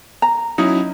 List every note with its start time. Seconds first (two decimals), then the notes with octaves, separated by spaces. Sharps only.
0.22 A#5
0.58 F#3 C#4 D#4 E4